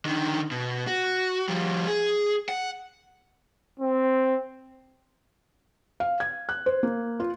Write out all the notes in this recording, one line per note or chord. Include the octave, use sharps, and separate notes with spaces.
D3 D#3
B2
F#4
F3 G3
G#4
F#5
C4
F5
G#6
F#6
C5
A#3
F4